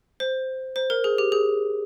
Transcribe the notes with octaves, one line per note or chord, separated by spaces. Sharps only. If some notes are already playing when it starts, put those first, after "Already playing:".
C5
C5
A#4
G#4
G4
G#4